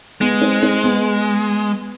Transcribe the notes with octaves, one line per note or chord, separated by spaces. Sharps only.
G#3 B3
C4
C4
B3